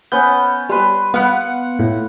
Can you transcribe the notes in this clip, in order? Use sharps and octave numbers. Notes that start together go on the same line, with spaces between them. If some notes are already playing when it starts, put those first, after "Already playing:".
B3 C#4 G6
G3 B4 C6
B3 B4 F5 F#5
A2